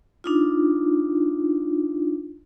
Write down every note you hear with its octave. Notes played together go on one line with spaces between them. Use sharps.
D4 D#4 F4